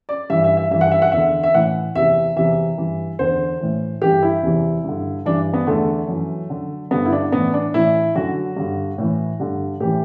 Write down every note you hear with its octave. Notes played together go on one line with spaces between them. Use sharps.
D5
G2 E3 E5
E5
E5
G2 E3 E5
F#5
E5
F#5
E2 D3 E5
E5
A2 E3 F#5
E2 C3 E3 E5
E2 C3 E3 E5
G2 E3
E2 D3 C5
A2 E3
G2 E3 G4
E4
E2 C3 E3
G2 D3
G2 E3 D4
B3
E2 D3 A3
F#2 E3
F#2 D3
G2 D3 B3
E4
D4
A2 E3 B3
D4
A2 E3 E4
F#2 D3 F#4
G2 D3
A2 E3
G2 D3
A2 E3 G4